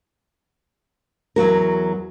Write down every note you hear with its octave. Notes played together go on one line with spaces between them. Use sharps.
E2 F#3 F#4 A#4